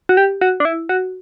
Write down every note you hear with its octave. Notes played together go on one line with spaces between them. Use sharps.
F#4
G4
F#4
D4
E4
F#4